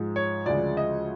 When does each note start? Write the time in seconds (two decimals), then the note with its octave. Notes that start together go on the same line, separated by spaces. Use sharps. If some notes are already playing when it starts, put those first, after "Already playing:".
Already playing: G#2 F3 G#3
0.16 C#5
0.46 D2 C#3 F3 G#3 D5
0.77 D#5